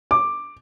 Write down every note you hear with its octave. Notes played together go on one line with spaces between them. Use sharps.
D6